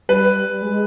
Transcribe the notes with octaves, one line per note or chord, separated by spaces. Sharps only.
G3 B4
G#3